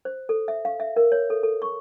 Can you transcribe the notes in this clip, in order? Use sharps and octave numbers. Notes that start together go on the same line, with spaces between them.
C5
A4
E5
F5
E5
A#4
C#5
A4
A4
C#6